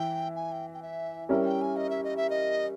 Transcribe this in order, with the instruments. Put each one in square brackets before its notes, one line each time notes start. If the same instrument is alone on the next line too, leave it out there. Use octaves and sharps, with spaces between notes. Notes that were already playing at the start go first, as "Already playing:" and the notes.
Already playing: [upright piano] E3 E4 [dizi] G5
[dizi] G#5
G5
G5
E5
[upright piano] G3 C#4 E4 A#4 [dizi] G5
[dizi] G5
G#5
D#5
E5
D#5
E5
D#5